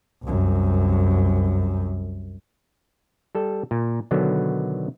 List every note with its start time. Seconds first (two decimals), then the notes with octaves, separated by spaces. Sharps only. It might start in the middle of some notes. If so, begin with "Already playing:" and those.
0.23 C2 F#2
3.35 G3 A4
3.71 A#2
4.11 B2 D3 D#3 F#3 B3